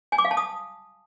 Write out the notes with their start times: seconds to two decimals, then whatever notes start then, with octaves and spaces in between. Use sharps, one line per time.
0.12 G#5
0.18 D6
0.25 F5
0.31 A5
0.37 D#6